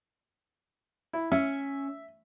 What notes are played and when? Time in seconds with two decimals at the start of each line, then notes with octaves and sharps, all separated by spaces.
1.13 E4
1.32 C#4 E5